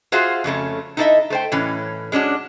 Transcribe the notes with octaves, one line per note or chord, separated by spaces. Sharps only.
F4 F#4 G#4 C5 E5 F5
F2 C#3 A3 C#4
D#4 E4 A4 C5 D#5 E5
A3 C5 G5
A2 E3 C#4
G#3 C#4 D4 F#4